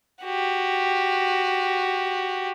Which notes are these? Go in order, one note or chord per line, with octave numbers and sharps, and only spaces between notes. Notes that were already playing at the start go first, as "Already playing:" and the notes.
F#4 G4